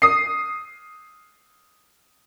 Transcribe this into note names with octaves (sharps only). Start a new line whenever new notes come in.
D#6 C7